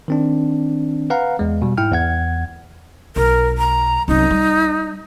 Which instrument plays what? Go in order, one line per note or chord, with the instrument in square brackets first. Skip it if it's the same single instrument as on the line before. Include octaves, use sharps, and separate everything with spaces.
[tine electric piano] D#3 C4 D4
B4 F5 F#5 A#5
E2 G#3
B2 G3
G#2 E4 G5 F6
E2 F#5 G#6
[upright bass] B1 [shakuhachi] A#4
[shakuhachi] A#5
[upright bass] C2 F#2 [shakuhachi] D#4
[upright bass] G3